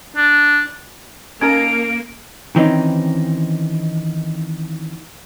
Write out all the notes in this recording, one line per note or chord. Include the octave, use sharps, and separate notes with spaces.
D4
A#3 C#4 D#4 A4 A#4 D7
D#3 E3 C4 C#4 D#4